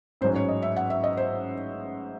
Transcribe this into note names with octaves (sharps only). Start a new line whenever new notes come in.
A1 G#2 F#3 C#4 C5
C#5
D#5
E5
F#5
E5
D#5
C5